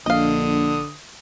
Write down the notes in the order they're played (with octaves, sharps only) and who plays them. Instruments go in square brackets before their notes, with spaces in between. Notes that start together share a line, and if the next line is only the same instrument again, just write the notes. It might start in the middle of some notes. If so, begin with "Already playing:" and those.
[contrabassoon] A#1 [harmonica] D3 D#6 [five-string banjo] D#5 F5